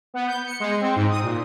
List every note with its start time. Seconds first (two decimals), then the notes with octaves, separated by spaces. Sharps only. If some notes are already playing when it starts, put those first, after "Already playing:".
0.14 B3
0.27 G6
0.46 C#7
0.60 G#3
0.81 C4
0.96 G#2
1.10 D#6
1.23 A#2